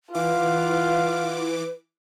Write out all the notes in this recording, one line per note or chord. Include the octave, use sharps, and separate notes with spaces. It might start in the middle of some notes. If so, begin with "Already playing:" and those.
E3 F4 B4 F5 F#5 D6